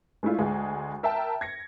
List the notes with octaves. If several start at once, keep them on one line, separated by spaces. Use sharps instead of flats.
G#3 A3 D4 E4 F4
D2 G#3
A#4 E5 G5 A5
G#6 A#6 C#7